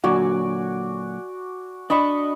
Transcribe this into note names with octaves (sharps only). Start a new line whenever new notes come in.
A#2 D3 F#3 F#4 D5 G#5
D4 D#5 B5 C#6